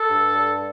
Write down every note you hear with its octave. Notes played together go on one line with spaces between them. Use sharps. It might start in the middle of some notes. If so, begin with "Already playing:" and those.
Already playing: A4
G2
G3